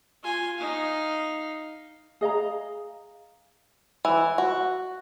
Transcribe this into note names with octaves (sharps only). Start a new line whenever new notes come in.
F4 G#5
D#4 F5
G#4 D#5 F5 A#5
E3
F#4